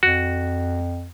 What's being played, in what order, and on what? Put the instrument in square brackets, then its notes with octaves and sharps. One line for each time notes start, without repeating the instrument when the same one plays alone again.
[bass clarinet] F2 [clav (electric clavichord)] F#4